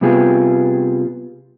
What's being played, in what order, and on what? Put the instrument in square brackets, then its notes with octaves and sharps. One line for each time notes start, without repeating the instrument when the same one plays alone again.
[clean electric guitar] C3 G3 B3 F4 G#4